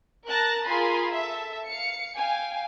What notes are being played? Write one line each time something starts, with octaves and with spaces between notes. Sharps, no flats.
A#4 A5 F#6 A#6
F4 G#4 A#4 G#5 B5 C6
A4 E5
F5 C#7
F5 G5 G#5